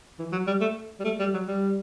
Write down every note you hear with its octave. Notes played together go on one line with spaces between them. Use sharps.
E3
F#3
G3
A3
G3
A3
G3
F#3
G3